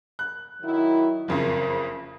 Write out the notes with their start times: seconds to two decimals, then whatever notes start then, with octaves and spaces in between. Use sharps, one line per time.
0.19 F#6
0.62 D#3 F#3 E4
1.28 F#1 F2 C#3 A#4